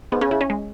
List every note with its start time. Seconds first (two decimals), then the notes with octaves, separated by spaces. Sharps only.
0.12 G#2 B3
0.21 C#3 C#4
0.31 C#3 E4
0.41 C#4
0.50 G#3